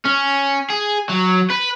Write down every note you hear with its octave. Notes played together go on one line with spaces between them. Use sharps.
C#4
G#4
F#3
B4